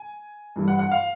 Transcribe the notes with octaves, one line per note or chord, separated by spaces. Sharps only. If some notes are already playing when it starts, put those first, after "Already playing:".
Already playing: G#5
G2 E3 G3
F#5
F#5
F5